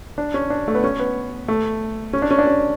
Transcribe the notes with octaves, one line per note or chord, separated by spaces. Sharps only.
D4
C#4
D4
A3
B3
C#4
B3
A3
C#4
D4
C#4
D4
C#4